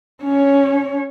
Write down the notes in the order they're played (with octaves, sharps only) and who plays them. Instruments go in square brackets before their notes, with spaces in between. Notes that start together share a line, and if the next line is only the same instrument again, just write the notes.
[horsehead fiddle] C#4 C#5